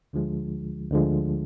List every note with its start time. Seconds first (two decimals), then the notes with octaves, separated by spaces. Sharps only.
0.13 D2 D3 F3 G#3
0.91 D2 D3 F3 G#3